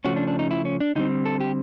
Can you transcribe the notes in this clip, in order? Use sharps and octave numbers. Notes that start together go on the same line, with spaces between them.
C#3 F3 A3 C#4 F#4
D4
D4
D#4
E4
C#4
D4
D3 G3 C4 D#4
A4
G4